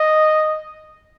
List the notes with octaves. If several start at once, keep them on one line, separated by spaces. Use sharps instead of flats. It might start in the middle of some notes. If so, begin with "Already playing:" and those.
Already playing: D#5